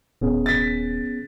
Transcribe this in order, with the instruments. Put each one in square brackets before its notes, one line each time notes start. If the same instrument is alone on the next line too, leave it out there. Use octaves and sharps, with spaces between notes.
[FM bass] D#1 [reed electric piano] B3 C#4 G#4
[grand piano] A6 B6